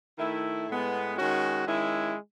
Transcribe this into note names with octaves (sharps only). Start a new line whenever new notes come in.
D#3 A3 E4
A2 G#3 B3
D#3 G#3 C#4 F#4
D#3 G#3 C#4 E4